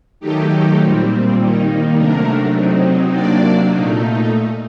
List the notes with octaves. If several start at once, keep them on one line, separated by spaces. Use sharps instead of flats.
D#3 F#3 A3 D#4 G4
A#2 G3 C4
D#3 G3 A#3 D#4
C3 F#3 A3 D4 A#4
C3 F#3 C4 D#4
C3 F#3 A#3 D4 D5
A#2 A3 D#4